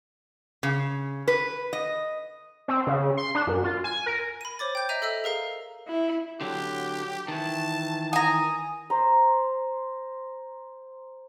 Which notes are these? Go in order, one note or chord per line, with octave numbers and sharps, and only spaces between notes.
C#3
B4
D#5
C4
C#3
C6
D4
F#2
F4
G#5
A#4
B5 D#7
C5 C#5 D6 A6
G5 G6
D#5 E5 A#5 G6 D#7
A4 D#5 E5 E6
G#4 A#4 F5 A#5
E4
D3 F#3 G4
D#3 E3 A5
G#5 A#5 D#6
C5 A#5